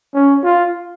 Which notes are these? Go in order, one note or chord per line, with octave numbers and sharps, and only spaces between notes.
C#4
F4